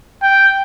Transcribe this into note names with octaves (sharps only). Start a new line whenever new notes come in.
G5